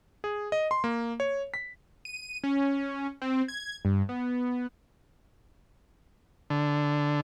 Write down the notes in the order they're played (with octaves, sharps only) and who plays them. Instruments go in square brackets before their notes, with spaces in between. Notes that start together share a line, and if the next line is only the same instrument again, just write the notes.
[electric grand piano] G#4
D#5
C6
A#3
C#5
B6
[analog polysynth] D#7
C#4
C4
G#6
G2
B3
[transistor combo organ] D3